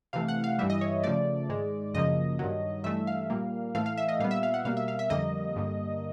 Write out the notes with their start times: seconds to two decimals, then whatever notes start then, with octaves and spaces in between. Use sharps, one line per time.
0.13 C3 E3 A3 F5
0.28 F#5
0.44 F5
0.59 G2 E3 G3 E5
0.70 D#5
0.81 C#5
1.04 C#3 F3 A3 D5
1.49 G#2 D#3 G#3
1.94 F#2 C#3 F3 A#3 D#5
2.39 G2 D#3 F#3
2.84 G2 E3 A3 E5
3.07 F5
3.30 A#2 G3 A#3
3.75 A2 E3 A3 F5
3.86 F5
3.97 E5
4.08 D#5
4.20 A#2 G3 B3 F5
4.31 E5
4.43 F5
4.54 F#5
4.65 B2 G3 A#3 F5
4.77 E5
4.88 F5
4.99 E5
5.10 F2 D3 G3 A#3 D#5
5.56 G2 D3 G3 A#3